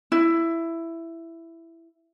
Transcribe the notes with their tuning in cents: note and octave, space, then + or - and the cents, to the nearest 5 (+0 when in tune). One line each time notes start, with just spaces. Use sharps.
E4 +10